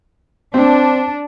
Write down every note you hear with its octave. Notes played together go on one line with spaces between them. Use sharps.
C4 D4